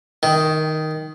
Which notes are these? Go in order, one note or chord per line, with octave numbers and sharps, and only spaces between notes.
D#3